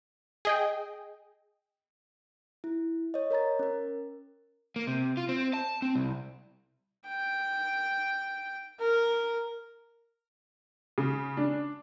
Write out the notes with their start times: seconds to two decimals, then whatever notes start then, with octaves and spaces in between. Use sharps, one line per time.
0.45 G#4 D#5 G5
2.64 E4
3.14 C#5 D#5
3.31 A#4 C#5 A#5 A6
3.59 C#4 A#4
4.76 A#3
4.87 C3
5.17 F4
5.29 C4
5.54 A5
5.82 C4
5.95 C2
7.08 G5
8.80 A#4
10.98 C#3
11.37 D4